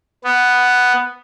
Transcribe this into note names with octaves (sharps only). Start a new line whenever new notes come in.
B3